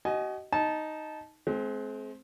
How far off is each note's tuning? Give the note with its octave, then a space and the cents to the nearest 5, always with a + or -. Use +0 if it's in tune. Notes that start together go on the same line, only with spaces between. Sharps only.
F#4 +45 D#5 +0 G#5 +25
D#4 +0 A5 -15
G#3 +40 C4 +0